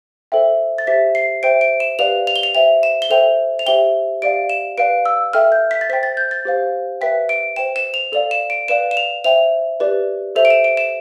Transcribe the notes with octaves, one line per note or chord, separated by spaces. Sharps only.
A4 C5 E5 G5
A6
G4 C5 E5 B6
C7
C5 E5 G5 D7
D7
E7
G4 B4 D5 F5 F7
F7
G7
F7
C5 E5 G5 F7
E7
G7
A4 C5 E5 G5 F7
F7
G4 C5 E5 G5 G7
G4 D5 F5 D7
E7
B4 D5 F5 D7
E6
A4 E5 G5 F6
G6
B6
A6
C5 G5 B6
A6
G6
A6
G4 C5 F5
B4 E5 G5 B6
D7
C5 G5 E7
E7
F7
A4 D5 F5 F7
E7
D7
B4 D5 F5 E7
E7
F7
C5 E5 G5 F7
G4 B4 D5
A4 C5 E5 F7
D7
E7
D7
E7